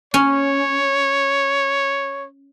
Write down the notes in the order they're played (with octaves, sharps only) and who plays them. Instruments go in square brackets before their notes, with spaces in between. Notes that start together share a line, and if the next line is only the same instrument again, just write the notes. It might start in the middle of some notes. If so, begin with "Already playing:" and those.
[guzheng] C#4 [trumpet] C#5